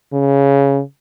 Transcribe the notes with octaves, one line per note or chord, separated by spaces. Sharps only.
C#3